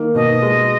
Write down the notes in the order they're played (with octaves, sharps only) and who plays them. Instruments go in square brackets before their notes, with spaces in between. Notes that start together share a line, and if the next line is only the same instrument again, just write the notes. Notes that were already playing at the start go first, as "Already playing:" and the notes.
Already playing: [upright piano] D#3 A#3
[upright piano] B2 [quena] D#5
[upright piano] G#3